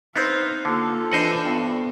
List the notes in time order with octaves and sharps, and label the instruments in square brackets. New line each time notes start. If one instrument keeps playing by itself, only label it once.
[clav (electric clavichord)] B3 C4 [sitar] D#4 C5 [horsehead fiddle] F5
[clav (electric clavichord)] D3 [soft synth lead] A#3 [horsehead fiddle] F4 A4
[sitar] E3 C4 D4 [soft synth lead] B4 [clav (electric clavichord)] C5 D#5 F#5
[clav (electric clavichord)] G2 [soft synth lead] B3